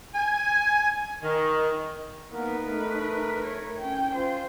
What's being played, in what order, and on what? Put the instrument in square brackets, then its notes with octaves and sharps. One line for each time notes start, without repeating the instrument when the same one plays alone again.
[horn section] G#5
D#3
[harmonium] A#3 B3 A#4 [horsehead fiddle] D#4 B4
[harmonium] A3 A#4
[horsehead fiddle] C#5
C#4 G5
[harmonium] F4 [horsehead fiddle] C5